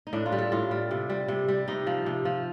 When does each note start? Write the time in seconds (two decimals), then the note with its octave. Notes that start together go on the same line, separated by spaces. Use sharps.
0.07 D#4
0.13 A2 D4
0.26 F4
0.32 G3
0.38 A4
0.52 A2 F4
0.71 G3
0.91 C3
1.10 G3
1.28 C3
1.48 G3
1.68 C3 D#4
1.87 F3
2.06 C3
2.25 F3